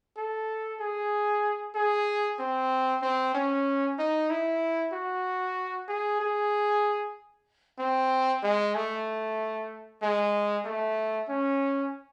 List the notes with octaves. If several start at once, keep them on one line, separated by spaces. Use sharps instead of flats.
A4
G#4
G#4
C4
C4
C#4
D#4
E4
F#4
G#4
G#4
C4
G#3
A3
G#3
A3
C#4